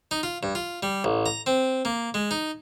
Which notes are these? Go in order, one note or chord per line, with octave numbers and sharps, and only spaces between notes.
D#4
F4
G2
F4
G3
A1
A#5
C4
A#3
G#3
D#4